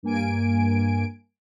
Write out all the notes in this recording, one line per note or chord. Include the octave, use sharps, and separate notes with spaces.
G2 A#3 G#5 D7